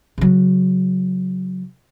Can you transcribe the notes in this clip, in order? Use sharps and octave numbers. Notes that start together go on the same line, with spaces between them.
C#3 F#3